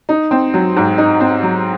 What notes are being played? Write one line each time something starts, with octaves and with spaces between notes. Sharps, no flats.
D#4
C4
F#3
G#2
D#4
C4
F#3